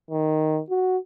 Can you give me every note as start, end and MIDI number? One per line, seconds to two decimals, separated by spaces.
0.11 0.60 51
0.70 0.97 66